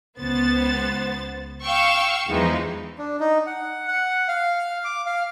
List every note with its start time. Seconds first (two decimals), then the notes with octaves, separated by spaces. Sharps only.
0.19 C#2 B3 C5 A6
1.62 F5 G5 C#6 E6
2.28 E2 E3 F3 G#3 D#4
2.98 D4
3.20 D#4
3.47 F#5
3.88 F#5
4.28 F5
4.84 D6
5.06 F5